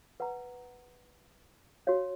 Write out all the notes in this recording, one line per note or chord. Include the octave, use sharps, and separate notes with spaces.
B4 F#5 A#5
F#4 C#5 F5